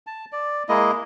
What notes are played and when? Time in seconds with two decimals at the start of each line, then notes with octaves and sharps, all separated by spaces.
0.07 A5
0.32 D5
0.69 G#3 A#3 E4 D#5